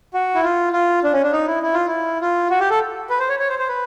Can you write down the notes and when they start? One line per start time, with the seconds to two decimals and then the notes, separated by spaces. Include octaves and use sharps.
0.14 F#4
0.35 E4
0.43 F4
0.73 F4
1.04 D4
1.13 C#4
1.23 D4
1.33 D#4
1.47 E4
1.63 E4
1.74 F4
1.87 E4
2.21 F4
2.50 F#4
2.60 G4
2.70 A4
3.10 B4
3.20 C5
3.29 C#5
3.39 C#5
3.49 C5
3.59 C5
3.68 B4